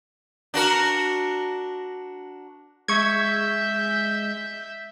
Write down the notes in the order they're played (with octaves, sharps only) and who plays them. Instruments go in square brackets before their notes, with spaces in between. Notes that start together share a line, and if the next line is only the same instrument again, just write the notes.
[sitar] D4 F#4 A#4
[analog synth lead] G#3 [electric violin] E5 G6 [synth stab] C#6 G#6